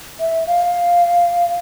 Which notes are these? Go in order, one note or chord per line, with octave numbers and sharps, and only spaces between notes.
E5
F5